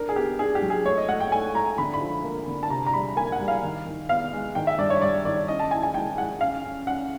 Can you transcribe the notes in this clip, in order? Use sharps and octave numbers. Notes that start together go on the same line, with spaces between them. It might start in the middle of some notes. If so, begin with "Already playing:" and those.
Already playing: D4 A#4
G#4
B3 G4
D4 G#4
G4
F#3
G#4
A3 C#5
D#5
A3 F#5
G5
A3 G#5
A3 A#5
D3 B5
B5
F3
A#3
D3
A5
C3 A#5
A#5
G3 B5
A#3 G#5
F#5
G3
F5
D#3
D#3
B3 F5
G#3
D#3 G5
E5
G2 D5
C#5
G3 D5
D#3 D5
C#4 D#5
A5
E4 G#5
G#5
G#3 G5
G#3 F#5
C#4 F5
C#4
C#4 F#5